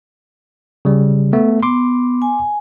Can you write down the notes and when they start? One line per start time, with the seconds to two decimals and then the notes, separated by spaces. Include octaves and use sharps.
0.85 C#3 G3
1.33 A3 B3
1.63 B3 C6 D6
2.22 G#5